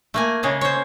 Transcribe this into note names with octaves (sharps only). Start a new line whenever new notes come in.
A3 A#3 G#5
C#3 G#3 A#3
C5 C#5